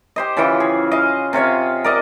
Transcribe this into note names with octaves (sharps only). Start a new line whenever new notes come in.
G4 C5 D#5
C#3 E3 F4 G5
G#4
D#5 F5
C3 F4 C#5 F5
A#4 D5 D#5